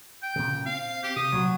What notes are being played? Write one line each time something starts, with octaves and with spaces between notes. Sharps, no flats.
G5
A#2 C#3
C4 F5
G4
C3 D#6
C2 A#2 F#3